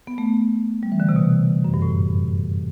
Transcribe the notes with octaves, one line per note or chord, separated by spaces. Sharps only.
B3
A3
G3
E3
D3
C3
B2
F#2
G2
A2